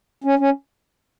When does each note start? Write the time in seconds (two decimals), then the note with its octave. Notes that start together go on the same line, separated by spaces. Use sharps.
0.24 C#4
0.39 C#4